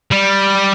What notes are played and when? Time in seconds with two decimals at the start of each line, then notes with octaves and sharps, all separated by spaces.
0.11 G3